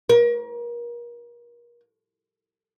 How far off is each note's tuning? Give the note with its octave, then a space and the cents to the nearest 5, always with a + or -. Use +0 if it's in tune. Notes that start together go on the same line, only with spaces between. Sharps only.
A#4 +35